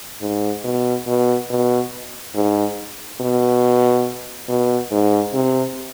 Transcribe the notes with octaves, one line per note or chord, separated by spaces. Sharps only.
G#2
B2
B2
B2
G#2
B2
B2
G#2
C3